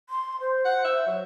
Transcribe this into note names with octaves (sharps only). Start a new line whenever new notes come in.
C6
C5
F#5
E5
F#3